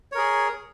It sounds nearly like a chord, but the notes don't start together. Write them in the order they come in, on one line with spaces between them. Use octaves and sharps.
C#5 A#4 G#4